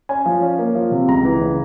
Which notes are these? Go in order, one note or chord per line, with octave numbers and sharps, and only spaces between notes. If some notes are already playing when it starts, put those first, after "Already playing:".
C#4 G#5
F3
C#4
A#3
F3
C3
C#2 A#5
E3
C#3